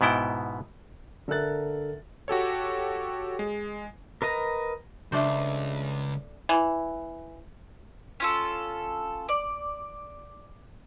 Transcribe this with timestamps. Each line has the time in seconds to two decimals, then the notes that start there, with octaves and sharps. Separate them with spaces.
0.01 G#2 B2 B3 E4 G5
1.28 D3 A4 A#4 E5 F#6 A6
2.28 F#4 G4 A4 C#5
3.39 G#3
4.22 A#4 B4 D#5 A#5
5.12 C#2 A3 D4 C5
6.49 E3
8.20 C#4 F4 A4
9.29 D5